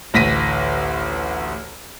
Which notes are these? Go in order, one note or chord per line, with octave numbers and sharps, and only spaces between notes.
A1 D2 A#6 B6 D#7